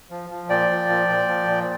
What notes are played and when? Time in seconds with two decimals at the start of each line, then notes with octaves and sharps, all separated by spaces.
0.10 F3
0.30 F3
0.49 A#2 D5 G5
0.70 F3
0.89 A#2
1.09 A#2
1.28 F3
1.47 A#2